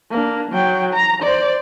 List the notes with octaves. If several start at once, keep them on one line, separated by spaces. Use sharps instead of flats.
A#3 D4
F#3 G5
A#5
C5 D5